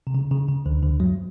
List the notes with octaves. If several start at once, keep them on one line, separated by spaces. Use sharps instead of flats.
C3
C#3
C#3
C#3
D2 D3
D2 D3
F#2 F#3